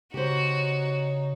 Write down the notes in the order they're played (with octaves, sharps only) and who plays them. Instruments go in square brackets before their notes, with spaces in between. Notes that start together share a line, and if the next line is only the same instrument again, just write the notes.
[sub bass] C#3 [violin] D#4 C#5 [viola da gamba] F#4 [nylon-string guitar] G4 C5